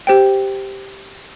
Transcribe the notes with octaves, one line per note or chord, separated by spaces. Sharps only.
G4 C5 G5